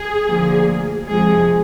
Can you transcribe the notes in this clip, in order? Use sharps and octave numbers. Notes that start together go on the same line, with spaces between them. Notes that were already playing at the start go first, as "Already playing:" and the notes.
Already playing: G#4
D2 D3 F3 A#3
F2 C3 F3 G#3 G#4